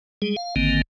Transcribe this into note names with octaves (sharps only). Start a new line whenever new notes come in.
G3 G#3 G#4
F5
G#1 D3 D#3 A#3 C4